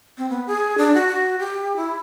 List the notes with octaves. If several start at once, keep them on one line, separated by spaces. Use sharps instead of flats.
C4
B3
G#4
D4
F#4
F#4
G4
E4